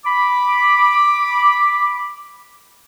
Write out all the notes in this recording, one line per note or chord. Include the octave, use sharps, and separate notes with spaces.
B5 D6